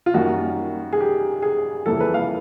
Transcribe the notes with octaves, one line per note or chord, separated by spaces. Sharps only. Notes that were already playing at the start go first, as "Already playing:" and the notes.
F4
F#2 D#3 G3 A#3 F#4
G#4
G4
G#4
F2 C#3 E3 G3 A#3 A4
B4
F5